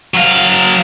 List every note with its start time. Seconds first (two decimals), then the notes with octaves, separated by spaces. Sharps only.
0.14 F#3 F5